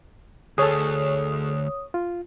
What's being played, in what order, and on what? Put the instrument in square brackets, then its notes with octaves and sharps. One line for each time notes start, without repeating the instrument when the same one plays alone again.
[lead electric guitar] D2 [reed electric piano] G#4 A4 [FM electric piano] C#5 D#6
[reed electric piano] F4